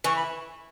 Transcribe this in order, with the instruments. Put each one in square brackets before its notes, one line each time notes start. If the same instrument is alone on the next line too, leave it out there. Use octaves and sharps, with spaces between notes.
[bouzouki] E3 [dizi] C#6
[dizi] B5